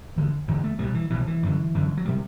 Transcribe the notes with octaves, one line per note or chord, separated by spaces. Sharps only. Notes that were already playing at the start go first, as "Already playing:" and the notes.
E2 D3
E2 D3
A3
C2 B2 G3
E3
C2 B2 E3
E3
F#2 D3
F#2 D3
F#3
C3 G3